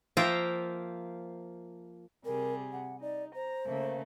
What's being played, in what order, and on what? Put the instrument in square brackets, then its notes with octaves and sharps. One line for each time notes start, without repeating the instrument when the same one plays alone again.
[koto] F3 A#3 F4 E5 G5 A#5
[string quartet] C3 G3 G#4 [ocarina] A#4
[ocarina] F#5
[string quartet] D#4 [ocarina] D5
[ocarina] C5 [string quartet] A#5
[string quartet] C#3 A3 A#3